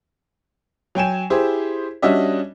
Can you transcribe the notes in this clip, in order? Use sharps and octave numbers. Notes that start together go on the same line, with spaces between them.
F#3 G5 G#5 E7
E4 G4 G#4 C5
G3 C#4 D4 F#4 D#5 E5